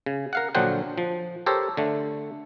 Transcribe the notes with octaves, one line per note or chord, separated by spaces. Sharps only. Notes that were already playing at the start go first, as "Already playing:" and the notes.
C#3
A#4 F5 F#5
A#1 D3 F#3 C5 F#5 G5
F3
G4 A4 A#4 C5 C#5
D3 A3